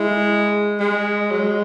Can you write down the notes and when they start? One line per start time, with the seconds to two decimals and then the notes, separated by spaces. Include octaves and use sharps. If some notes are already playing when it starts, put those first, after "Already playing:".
Already playing: G#3 E4
0.80 G#3
1.31 F#3
1.40 G#3